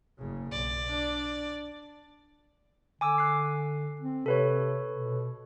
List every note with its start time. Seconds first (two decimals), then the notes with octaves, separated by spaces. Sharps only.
0.18 F#1 C#3
0.52 B1 D5
0.89 D4
3.01 D3 G#5 D6 E6
3.18 F#6 C7
4.01 C4
4.26 C3 A4 B4 C#5
4.93 B2